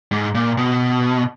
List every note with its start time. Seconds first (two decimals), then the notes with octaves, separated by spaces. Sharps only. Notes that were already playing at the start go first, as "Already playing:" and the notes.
0.11 G#2
0.35 A#2
0.58 B2